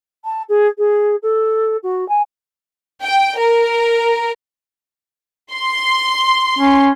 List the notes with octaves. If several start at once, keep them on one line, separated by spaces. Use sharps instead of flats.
A5
G#4
G#4
A4
F#4
G#5
G5
A#4
C6
C#4